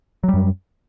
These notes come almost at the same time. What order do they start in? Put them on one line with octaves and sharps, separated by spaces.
F#3 G3 F#2